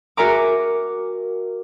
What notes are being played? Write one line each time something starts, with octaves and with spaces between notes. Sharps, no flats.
F#4 A#4 E5 G#5 A#5 D6